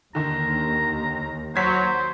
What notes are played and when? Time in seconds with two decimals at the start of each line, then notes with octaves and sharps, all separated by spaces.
0.15 D#2 D3 D#3 A#5
1.56 F#3 C5 G#6 B6